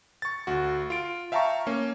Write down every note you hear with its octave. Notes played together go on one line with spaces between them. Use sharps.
C#6 A6
D2 F#4
F4 D7
E5 F5 G5 A5 A#5 C#6
A#3 C#4